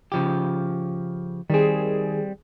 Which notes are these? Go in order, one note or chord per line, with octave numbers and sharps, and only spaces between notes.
C#3 F3 G4
D#3 G3 C4 G#4